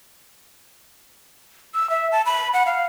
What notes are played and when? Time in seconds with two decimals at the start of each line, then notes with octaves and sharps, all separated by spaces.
1.74 E6
1.90 E5
2.12 A5
2.26 B5
2.54 F#5
2.66 F5